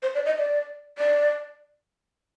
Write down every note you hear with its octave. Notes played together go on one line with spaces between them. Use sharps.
C5
D5
D#5
D5
D5